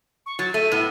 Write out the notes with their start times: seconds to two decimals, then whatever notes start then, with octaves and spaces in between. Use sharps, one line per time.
0.26 C#6
0.39 F#3 A6
0.54 A3 D#7
0.72 A2 B3